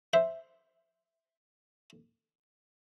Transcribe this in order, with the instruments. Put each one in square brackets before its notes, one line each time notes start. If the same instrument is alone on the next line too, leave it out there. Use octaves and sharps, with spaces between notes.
[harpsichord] C5 E5